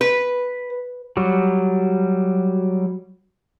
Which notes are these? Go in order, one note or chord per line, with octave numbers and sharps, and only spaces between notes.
B4
F#3 G3